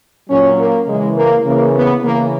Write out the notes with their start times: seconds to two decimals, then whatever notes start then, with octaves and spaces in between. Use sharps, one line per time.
0.29 A#2 F#3 C#4
0.59 A#3
0.87 C#3 E3 G#3
1.16 A#3
1.46 C#3 E3 A#3
1.75 B3
2.03 C#3 E3 A#3